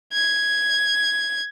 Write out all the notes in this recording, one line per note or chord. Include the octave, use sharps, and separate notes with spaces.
G#6